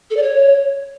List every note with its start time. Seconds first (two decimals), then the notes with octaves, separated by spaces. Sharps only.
0.10 A4
0.16 D5
0.22 C#5